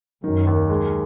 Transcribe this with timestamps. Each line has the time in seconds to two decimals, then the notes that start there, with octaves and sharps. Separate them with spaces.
0.24 F#2 D#3
0.47 D#2
0.69 G#3